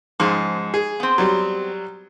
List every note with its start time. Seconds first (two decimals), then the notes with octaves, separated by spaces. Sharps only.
0.20 G#2 F3 C#4 G#4
0.74 G#4
1.00 B3 C4
1.18 F#3 G3